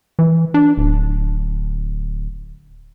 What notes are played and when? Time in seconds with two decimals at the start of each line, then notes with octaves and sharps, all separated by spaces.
0.19 E3
0.54 D4
0.77 D1